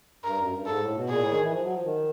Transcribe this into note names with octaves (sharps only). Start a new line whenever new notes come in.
G2 A#4
F#2
G2
G#2 A4
A2
B2
A#2 G#4
A2
D#3
E3
F3
F#3
F3
D#3